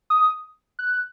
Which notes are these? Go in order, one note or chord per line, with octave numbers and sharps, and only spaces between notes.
D#6
F#6